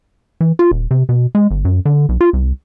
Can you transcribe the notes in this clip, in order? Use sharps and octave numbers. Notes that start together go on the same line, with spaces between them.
E3
F4
D#1
C3
B2
G#3
G1
F#2
D3
B1
F4
C2